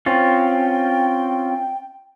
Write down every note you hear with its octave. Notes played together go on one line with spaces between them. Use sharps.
C4 C#4 F4 G5